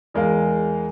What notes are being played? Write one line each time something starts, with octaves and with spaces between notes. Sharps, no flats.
E2 G#3 A#4 F5